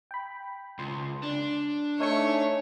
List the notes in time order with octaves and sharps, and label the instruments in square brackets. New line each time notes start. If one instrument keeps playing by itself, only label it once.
[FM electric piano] G5 B5
[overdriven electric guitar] C#2 [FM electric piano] C6
[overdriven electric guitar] D4
[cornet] A3 [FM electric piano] D#4 G#5 C#7 [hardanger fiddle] C#5